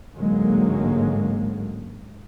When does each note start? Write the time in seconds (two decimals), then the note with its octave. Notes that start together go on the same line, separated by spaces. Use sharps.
0.16 A1 G#2 D3 F#3 G#3 A#3